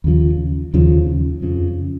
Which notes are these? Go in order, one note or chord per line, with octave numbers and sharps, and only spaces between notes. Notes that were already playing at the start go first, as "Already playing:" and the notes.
D#2 C#3 F3
D#2 C#3 F3
F2 C#3 F3